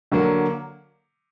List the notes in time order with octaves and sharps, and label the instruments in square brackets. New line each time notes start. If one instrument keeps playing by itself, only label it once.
[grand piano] D3 F#3 A#3